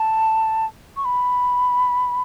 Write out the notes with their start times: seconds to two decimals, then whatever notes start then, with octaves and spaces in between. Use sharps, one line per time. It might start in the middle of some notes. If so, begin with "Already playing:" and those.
Already playing: A5
0.97 C#6
1.05 B5